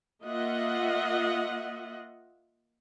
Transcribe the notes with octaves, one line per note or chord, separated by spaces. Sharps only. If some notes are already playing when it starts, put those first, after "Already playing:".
A#3 F4 D#5 E5 F#5